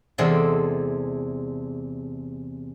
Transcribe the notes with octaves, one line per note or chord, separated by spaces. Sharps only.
E2 C3 G#3 C4 D4 A4